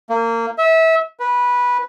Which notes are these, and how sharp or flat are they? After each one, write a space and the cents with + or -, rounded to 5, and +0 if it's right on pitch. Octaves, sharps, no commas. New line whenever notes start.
A#3 -25
E5 -25
B4 -15